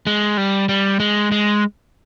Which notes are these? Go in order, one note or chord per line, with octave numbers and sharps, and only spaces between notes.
G#3
G3
G3
G#3
G#3